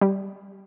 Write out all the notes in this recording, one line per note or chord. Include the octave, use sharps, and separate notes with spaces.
G3